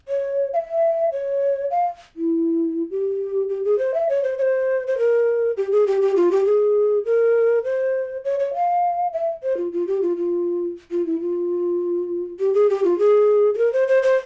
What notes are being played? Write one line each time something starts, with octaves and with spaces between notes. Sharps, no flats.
C#5
F5
E5
C#5
F5
E4
G4
G4
G#4
C5
E5
C#5
C5
C#5
C5
C5
A#4
G4
G#4
G4
G4
F4
G4
G#4
A#4
C5
C#5
C#5
F5
E5
C5
F4
F4
G4
F4
F4
F4
E4
F4
G4
G#4
G4
F4
G#4
G#4
A#4
C5
C5
C5